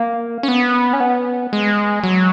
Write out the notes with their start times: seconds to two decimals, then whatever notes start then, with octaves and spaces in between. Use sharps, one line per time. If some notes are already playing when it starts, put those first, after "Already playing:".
Already playing: A#3
0.43 C#4
0.48 B3
0.93 C#4
1.00 B3
1.53 G#3
2.04 F#3